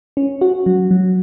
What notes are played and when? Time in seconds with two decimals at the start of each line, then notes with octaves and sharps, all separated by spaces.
0.17 C#4
0.41 F#4
0.66 F#3
0.91 F#3